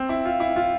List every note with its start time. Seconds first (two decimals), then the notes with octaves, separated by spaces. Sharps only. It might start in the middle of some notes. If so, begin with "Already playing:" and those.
Already playing: C4
0.09 E4
0.25 F4
0.40 E4
0.56 F4